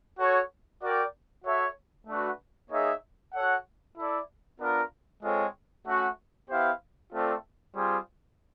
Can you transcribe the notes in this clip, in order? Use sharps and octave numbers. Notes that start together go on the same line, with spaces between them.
F#4 A4 C#5
F#4 A#4 D5 G5
F#4 A4 C#5 E5
A3 D4 F#4 B4
A#3 D#4 G#4 C#5 E5
F#4 A4 C#5 F#5
E4 A4 D5
B3 D4 F4 A#4
G#3 C4 F4 A4 C#5
A3 C#4 F#4
B3 E4 G4 C5 F5
A3 C4 F4 A4 D5
G3 C4 F4 G#4 C5